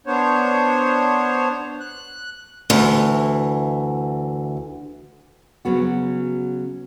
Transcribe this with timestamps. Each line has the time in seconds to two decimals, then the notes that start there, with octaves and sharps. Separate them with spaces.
0.07 B3 D4 C5 C#5
1.80 F#6
2.70 D2 E3
5.65 C#3 F#3 B3 F#4